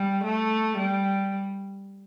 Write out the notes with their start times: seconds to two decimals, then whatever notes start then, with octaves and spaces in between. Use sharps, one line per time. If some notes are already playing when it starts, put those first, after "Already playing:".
Already playing: G3
0.23 A3
0.78 G3